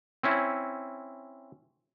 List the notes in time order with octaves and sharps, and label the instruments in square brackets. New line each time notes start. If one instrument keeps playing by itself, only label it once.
[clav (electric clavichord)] C4 C#4 E4